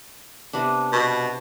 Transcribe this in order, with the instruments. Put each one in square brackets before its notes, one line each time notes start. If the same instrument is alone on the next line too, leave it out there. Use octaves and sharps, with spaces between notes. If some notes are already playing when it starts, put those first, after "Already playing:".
[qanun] C3 B3 D4
[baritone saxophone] B2